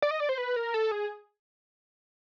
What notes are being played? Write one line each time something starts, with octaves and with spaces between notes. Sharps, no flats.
D5
D#5
D5
C5
B4
A#4
A4
G#4